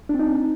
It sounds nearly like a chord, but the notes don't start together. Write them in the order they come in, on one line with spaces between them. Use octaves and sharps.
D4 C4 D#4